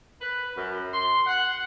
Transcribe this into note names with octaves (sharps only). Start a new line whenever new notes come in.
B4
F#2
C6
F#5